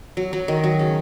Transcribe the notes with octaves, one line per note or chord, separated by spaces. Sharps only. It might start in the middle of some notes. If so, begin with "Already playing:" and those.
F#3
F#3
D#3
F#3
C#3